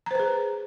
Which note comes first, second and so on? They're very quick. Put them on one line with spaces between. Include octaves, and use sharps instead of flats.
A#5 C5 B4 G#4